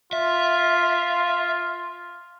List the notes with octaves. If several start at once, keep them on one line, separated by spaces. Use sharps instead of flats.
F4 E5